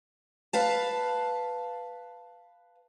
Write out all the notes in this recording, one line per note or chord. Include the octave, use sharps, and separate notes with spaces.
B4 F5 A5